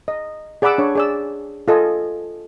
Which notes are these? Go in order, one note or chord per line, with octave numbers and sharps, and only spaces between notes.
D#5
G#4 D5 F#5 B5 D6 E6
D4 C#5
G#4 D5 E6
F4 A4 D#5 G#5